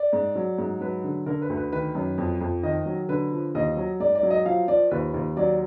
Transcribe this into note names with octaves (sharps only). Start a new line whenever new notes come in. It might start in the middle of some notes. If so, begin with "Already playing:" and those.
Already playing: D5
G#2
F#3
G#2
F#3 B4
D3
D3 A#4
B4
D2
B4
D#3 B4
F#2
F2
F2
D#3 D#5
F#3
D3 B4
F3
D#2 D#5
F#3
G#2 D5
D5
F#3
D#5
F3 F5
F3 D5
D#2 B4
D#2
F#3 D5